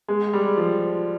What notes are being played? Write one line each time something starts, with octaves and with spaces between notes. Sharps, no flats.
G#3
G3
F3